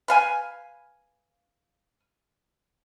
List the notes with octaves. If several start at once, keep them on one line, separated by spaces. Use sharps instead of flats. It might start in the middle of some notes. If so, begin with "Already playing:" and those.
B4 F5 G#5